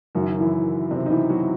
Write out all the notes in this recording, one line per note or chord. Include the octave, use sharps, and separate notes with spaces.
F#1 F#2 D#3 F#3 F#4
E3 E4
C3 C4
D#4
E3 E4
F#3 F#4